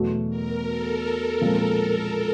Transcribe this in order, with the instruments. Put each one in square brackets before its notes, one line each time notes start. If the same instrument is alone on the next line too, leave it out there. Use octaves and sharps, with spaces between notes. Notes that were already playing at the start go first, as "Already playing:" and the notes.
Already playing: [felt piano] E2 B2 F#3 A3
[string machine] A#4
A4
[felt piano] A#2 F3 G#3 C4